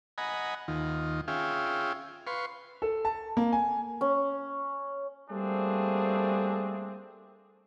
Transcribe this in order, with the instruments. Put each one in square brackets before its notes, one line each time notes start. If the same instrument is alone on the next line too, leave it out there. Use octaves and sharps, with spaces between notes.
[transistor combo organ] D#5 F#5 G#5 A#5 B5
D#2 D#3 F4
C#4 F4 G#4 E5 F5 G5
B4 F5 C6 C#6
[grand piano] A4
A5
A#3
G#5
[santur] C#4
[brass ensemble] G3 A3 A#3 C4 D4 G#4